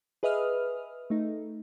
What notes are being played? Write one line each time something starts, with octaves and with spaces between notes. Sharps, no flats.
G#4 B4 D#5 E5 D#6 F6
A3 D#4